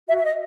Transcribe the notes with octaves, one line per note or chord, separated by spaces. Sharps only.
F#4 E5
E5
D#5